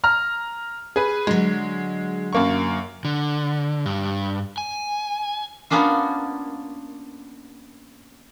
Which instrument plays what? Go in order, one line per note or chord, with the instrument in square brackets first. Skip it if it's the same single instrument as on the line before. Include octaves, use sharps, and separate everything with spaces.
[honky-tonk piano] A#5 F6
G#4 B4
[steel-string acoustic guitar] D3 F#3 [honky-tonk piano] G#3
[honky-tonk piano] F#2 A#3 C#6
[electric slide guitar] D3
G2
G#5
[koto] A#3 B3 C#4 D4 F4